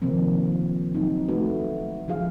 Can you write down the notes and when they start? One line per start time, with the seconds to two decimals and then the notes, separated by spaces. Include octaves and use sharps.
0.02 C3 D#3 F3 A#3 C4
0.94 F#3 C4 D#4
1.28 A3 D#4 F#4 B4
2.08 F3 F4 G#4 F5